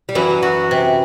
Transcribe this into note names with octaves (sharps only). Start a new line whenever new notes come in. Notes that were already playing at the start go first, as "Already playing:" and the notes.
G3
F#2 E3 F#3
F#4
C3